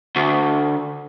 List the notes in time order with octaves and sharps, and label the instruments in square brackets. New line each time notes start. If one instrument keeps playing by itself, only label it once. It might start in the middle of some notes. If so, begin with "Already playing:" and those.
[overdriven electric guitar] D2